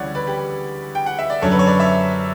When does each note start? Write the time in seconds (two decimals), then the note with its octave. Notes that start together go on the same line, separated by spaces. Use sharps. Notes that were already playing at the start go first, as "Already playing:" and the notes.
Already playing: D2 C#3 E3 G3 C#5 D5 F#5
0.15 B4 D5
0.27 G4 B4
0.95 G5
1.06 F#5
1.19 E5
1.30 D5
1.42 F#2 D3 F#3 A4 C#5
1.52 B4
1.59 C#5
1.67 B4 D5
1.80 C#5 E5